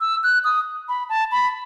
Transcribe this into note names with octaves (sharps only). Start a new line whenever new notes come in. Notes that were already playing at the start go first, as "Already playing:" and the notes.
E6
F#6
D#6
B5
A5
B5